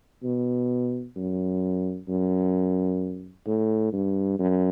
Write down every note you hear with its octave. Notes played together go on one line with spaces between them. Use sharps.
B2
F#2
F#2
A2
G2
F#2